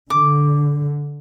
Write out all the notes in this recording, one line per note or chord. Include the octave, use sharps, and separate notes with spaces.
D3 D6